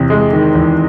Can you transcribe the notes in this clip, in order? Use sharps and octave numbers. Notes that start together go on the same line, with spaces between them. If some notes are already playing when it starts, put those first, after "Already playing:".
Already playing: E2 C3
G#3
D#3
E2